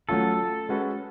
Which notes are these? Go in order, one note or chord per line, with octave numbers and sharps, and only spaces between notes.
F#3 A3 C#4 F4 A4
G#3 C#4 F#4 B4